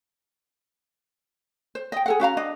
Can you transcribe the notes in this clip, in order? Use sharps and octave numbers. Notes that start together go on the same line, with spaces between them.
C5
D#5 G5
G#4 A4 F#5
C#4 F#4 F5 A#5
D4 D#5